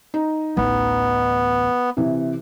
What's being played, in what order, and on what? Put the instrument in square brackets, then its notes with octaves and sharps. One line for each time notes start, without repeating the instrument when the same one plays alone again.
[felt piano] D#4
[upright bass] A1 D2 [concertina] B3
[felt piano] C3 E3